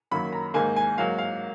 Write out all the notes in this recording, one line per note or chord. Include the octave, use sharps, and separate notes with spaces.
F#2 D#3 F#3 A#3 B5
A#5
G#2 D#3 A#3 G#5
G#5
G#2 F#3 A#3 F5
F5